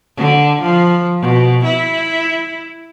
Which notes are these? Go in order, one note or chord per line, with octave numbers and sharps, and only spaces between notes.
D3
F3
B2
E4